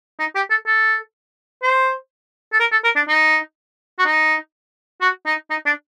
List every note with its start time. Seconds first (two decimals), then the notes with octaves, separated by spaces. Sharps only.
0.19 D#4
0.35 G4
0.50 A4
0.67 A4
1.63 C5
2.53 A4
2.60 A#4
2.72 A4
2.84 A#4
2.96 D4
3.08 D#4
3.99 F#4
4.06 D#4
5.01 F#4
5.26 D#4
5.50 D#4
5.66 D4